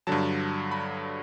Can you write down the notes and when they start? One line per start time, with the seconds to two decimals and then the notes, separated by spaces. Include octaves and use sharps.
0.07 G2 D3 F#3 A5
0.71 B5